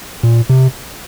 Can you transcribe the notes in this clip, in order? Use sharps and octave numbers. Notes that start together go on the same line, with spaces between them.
A#2
C3